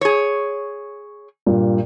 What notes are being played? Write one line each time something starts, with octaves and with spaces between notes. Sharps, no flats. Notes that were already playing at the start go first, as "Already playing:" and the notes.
G#4 C#5
G2 A#2